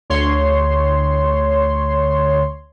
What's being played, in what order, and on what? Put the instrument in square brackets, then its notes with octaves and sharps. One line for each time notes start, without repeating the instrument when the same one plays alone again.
[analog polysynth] D2 C#5 C6